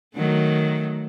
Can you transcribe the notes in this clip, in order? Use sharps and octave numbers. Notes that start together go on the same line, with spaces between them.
D#3 F#3 A3